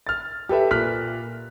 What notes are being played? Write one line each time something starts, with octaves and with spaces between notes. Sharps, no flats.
F6 A6
G4 A4 B4 E5
A#2 F6 F#6 B6